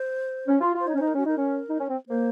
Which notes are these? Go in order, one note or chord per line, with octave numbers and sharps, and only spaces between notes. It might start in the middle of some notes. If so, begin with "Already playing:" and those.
Already playing: C5
C#4
F4
F4
C5
D#4 C#5
C#4
C5
D#4
A#4
C#4 F#4
D#4 A#4
C#4
D#4
C#4
C4
A#3 C5